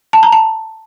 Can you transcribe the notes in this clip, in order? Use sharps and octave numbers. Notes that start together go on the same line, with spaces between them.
A5
A#5
A5